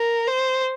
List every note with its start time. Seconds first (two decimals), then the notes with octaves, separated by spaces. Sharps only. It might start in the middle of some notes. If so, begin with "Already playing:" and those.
Already playing: A#4
0.27 C5